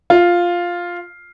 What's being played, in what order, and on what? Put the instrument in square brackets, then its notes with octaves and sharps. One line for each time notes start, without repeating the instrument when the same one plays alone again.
[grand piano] F4